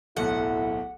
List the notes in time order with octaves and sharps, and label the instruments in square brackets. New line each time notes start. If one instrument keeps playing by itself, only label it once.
[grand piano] D1 B1 [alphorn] E4 [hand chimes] A4 [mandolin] F#5